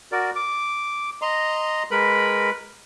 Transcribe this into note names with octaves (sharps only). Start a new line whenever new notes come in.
F#4 A#4 D5
D6
D#5 A#5 C6
G#3 A#4 B4 B5